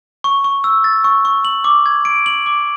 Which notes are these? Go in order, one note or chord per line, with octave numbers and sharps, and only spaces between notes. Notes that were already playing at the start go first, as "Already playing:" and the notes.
C#6
C#6
E6
A6
C#6
C#6
F#7
D6
G#6
D7
F#7
D6